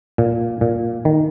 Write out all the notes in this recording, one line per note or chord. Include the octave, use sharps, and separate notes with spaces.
A#2
A#2
D#3